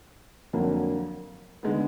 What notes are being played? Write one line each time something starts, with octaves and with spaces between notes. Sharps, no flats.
F2 D3 F#3 A#3
D3 G#3 B3